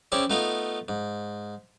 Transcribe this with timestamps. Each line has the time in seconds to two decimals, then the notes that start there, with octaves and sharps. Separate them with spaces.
0.12 C4 C#4 E4 G#4 D5
0.30 A3 B3 D#4 F4 F5
0.88 G#2